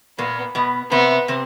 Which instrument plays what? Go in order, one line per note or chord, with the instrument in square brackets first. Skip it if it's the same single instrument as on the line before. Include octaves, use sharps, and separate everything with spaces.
[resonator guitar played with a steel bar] A#2 A#3 [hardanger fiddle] B3
[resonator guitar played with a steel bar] B2 B3
[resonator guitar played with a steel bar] C3 C4 [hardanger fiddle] B3
[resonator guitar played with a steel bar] C3 C4